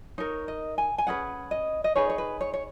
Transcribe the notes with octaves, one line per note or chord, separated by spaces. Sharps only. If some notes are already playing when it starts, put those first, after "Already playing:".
D#4 A#4 C#5
D#5
G#5
G#5
C#4 G#4 B4 F#5
D#5
D#5
D#4 G#4 B4 C#5
C#5
B4
C#5
C#5